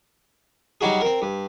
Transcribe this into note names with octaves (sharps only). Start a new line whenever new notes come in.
F#3 G3 D#4 F#4 G#4
C4 A#4
G2